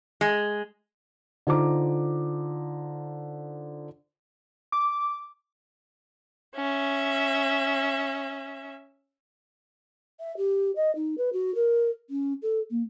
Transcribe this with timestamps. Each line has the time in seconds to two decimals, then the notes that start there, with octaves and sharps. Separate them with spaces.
0.21 G#3
1.47 D3 D#4 F4 C5 A#5 D6
4.72 D6
6.56 C#4 E5
10.20 E5
10.37 G4
10.76 D#5
10.96 D#4
11.18 B4
11.33 F#4
11.55 A#4
12.10 C#4
12.42 A4
12.71 A#3